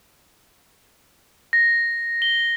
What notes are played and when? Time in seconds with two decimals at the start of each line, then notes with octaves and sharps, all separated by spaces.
1.53 A#6
2.22 G7